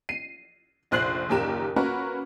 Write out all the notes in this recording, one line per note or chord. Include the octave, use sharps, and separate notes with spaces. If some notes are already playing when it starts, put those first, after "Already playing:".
C7 D#7
F1 A#1 C5 F#6 C7 F#7
F#1 D#2 A#2 G4 A#4 E7
A#3 C#4 F#4 A#4 B4